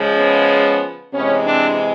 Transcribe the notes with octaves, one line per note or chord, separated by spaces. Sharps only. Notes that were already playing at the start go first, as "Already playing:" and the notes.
Already playing: C#3 F3 G#3
B3 C#4
C3 E3 G#3 B3 C#4
C4 D4